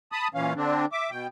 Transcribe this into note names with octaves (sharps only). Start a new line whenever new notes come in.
A5 B5 D#6
A#2 E3 C#4 F5
D3 C4 D4
E5 D6
B2 G5